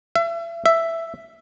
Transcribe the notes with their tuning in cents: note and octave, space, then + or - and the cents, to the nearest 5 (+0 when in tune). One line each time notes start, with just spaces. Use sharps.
E5 +35
E5 +5